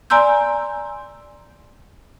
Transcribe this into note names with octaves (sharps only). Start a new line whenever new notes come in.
D5 G#5 A#5 C6 E6 G6